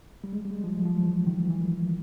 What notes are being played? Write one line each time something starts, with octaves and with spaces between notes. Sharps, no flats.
G3
G#3
G3
G#3
F3
F#3
F3
E3
D#3
E3